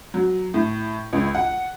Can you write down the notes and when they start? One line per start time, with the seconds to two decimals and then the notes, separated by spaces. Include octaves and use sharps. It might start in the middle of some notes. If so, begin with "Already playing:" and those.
0.14 F#3
0.54 A2
1.13 C#2
1.35 F#5